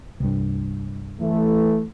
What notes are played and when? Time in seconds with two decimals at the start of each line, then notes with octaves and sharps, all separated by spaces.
0.20 C2 G2
1.21 E3 A3